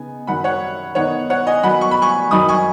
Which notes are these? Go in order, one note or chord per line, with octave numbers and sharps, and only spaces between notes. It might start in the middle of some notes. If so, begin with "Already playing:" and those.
Already playing: C#3 B3 D#4 G#5
F#2 D#3 F#3 F#5 B5
C#5 F#5
D#3 B3 D#4 C#5 F#5
C#5 F#5
D#5 G#5
D#3 F#3 B3 D#4 F#5 B5
C#6
B5
G#5 C#6
F#2 D#3 F#3 D#4 B5 D#6
G#5 C#6